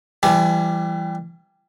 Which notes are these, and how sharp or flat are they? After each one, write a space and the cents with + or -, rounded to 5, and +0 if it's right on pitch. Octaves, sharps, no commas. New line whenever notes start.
E3 +30 G3 +0 G#5 +45